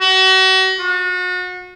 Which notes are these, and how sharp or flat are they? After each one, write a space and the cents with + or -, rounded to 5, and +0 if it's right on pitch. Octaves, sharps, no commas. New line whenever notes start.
F#4 +35
F#4 -35